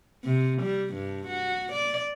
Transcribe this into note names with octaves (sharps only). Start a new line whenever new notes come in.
C3
G3
G2
F#4
D5